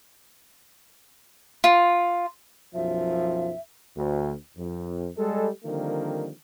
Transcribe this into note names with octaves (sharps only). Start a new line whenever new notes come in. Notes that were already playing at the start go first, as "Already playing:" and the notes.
F4
B1 F#2 F3 E5
D2
F2
G3 G#3 A4
D3 D#3 F3 G3 A#3 C4